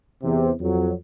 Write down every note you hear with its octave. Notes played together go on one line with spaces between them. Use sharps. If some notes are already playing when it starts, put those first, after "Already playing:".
E2 C3
F2 F#3